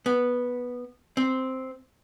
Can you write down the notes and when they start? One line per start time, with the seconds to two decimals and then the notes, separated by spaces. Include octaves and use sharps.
0.06 B3
1.17 C4